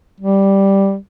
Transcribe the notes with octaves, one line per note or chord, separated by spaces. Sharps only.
G3